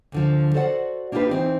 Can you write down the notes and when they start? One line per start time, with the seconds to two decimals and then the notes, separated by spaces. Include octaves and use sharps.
0.12 D2 D3 F3
0.54 F#4 A4 C5 D5 E5 F#5
1.12 A#3 D4 D#4 F4 G4 B4
1.29 E3 C4 D#4